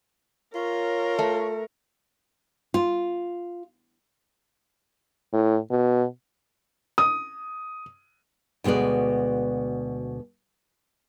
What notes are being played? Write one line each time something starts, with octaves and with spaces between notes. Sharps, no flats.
F4 A#4 C#5
A3
F4
A2
B2
D#6
D2 B2 G#3 B4 D5